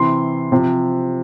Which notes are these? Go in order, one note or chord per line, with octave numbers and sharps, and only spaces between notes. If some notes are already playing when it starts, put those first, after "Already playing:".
Already playing: C3 E3 C6
C3 F3